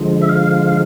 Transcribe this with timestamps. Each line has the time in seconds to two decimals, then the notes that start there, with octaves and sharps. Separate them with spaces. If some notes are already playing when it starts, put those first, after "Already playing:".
Already playing: D3 F3 G#3
0.22 E5
0.29 F5